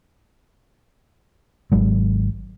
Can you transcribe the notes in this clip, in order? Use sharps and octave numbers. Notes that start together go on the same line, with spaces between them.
G#1 F#3 G#3